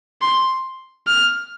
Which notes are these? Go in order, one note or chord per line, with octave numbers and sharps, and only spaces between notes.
C6
F6